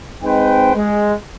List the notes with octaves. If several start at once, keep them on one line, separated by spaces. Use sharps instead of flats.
G#3 C4 D#4 B4 C5 G5
G#3